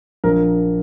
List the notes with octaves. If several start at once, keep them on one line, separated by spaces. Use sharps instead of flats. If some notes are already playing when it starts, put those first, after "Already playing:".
A#1 A#4